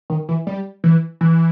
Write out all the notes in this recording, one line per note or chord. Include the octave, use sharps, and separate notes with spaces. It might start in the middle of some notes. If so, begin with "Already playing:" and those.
D#3
E3
G3
E3
E3